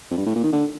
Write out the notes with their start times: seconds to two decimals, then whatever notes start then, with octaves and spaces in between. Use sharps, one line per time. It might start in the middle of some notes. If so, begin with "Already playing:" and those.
0.11 F2
0.17 G2
0.26 A2
0.35 A#2
0.44 D#3
0.52 D3